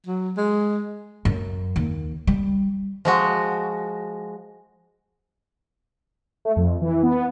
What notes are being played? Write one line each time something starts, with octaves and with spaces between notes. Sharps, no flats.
F#3
G#3
F#2
D#2
G3
F3 G#3 F#4
A3
F2
E3
B3